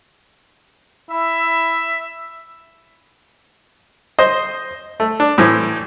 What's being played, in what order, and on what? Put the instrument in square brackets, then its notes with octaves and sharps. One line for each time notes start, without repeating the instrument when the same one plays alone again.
[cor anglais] E4 [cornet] E5
[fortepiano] C5 D#5
A3
D4
A2 E3 C4